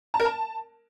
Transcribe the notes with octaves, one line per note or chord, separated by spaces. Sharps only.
A5
A#4
A5